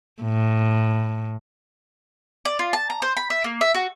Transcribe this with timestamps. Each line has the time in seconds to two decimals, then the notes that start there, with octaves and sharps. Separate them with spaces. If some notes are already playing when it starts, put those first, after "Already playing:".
0.22 A2
2.45 D5
2.59 F4
2.73 A5
2.90 A#5
3.02 C5
3.17 B5
3.30 E5
3.44 A#3
3.61 E5
3.74 F#4